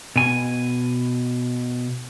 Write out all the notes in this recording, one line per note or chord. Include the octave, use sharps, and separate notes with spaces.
B2 G#5